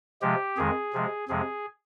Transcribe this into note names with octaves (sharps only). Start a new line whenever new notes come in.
C3 F3 G#3 G4
F2 D#3 G#3 G#4
C3 F3 G#3
F2 C3 F3 G#3 G#4